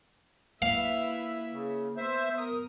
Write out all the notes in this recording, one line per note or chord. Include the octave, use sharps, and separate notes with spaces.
A#3 E4 B4 E5 F5
C#3
B3 C5 E5
A#4 D#6